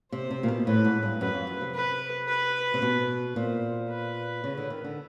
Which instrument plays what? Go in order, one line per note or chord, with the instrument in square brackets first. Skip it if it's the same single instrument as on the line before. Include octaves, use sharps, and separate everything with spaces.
[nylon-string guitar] C3 [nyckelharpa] C5
[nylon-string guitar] C3
A#2
B2
[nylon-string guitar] A2 [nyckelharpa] B4
[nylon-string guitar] G#2
G2
[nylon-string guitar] F#2 [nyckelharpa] B4
[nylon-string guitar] F2
F#2
C3
[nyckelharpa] B4
B4
[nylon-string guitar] C3
B2
[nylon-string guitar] A#2 [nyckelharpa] C5
[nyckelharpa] B4
[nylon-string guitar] C#3
D3
D#3
D3